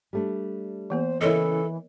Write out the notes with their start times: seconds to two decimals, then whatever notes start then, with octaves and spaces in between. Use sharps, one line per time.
0.13 G3 A3 D4
0.90 E3 A#3 B3 C5
1.21 C#3 E3 C#4 E4 A4 A#4 C#5 D#5